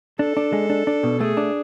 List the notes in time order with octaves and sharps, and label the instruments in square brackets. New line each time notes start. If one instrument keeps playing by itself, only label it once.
[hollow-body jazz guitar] D4 [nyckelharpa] A4
[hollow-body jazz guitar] D4
G#3
D4
D4
B2
[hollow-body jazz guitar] A3 [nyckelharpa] G#4
[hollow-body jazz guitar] D4